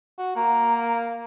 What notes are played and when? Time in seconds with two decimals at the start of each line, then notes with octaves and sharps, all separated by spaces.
0.18 F#4
0.36 A#3 A#5